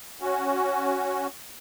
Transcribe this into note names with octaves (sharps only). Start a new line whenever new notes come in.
C#4 F#4